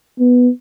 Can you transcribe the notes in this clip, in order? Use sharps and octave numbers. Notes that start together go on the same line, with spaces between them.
B3